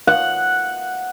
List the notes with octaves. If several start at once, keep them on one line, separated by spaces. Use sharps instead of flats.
F#5